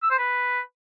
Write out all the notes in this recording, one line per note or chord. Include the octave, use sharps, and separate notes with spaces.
E6
C5
B4